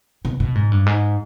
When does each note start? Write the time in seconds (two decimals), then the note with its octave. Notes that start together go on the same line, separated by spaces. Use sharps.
0.25 B2
0.40 B2
0.55 G#2
0.72 G2
0.86 G#2